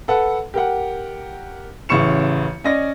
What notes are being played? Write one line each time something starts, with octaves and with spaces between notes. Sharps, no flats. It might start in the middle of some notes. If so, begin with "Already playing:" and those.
A4 B4 F#5
G4 A#4 F#5
A1 C#3 E4 C#6 C#7 E7
C#4 D5 D#5 A#6